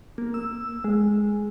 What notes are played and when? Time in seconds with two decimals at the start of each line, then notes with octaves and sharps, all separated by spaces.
0.18 A#3
0.34 E6
0.84 G#3